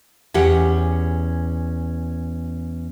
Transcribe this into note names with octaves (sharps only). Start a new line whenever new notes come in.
E2 C#4 G4 F#5